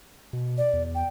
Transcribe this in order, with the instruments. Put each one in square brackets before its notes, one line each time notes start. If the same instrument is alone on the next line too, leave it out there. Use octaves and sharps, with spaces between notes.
[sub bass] B2
[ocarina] D5
[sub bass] E2
[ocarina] G5